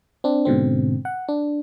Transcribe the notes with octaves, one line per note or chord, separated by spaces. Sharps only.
C4 D4
G#2 B2 D3 C4
F#5
D4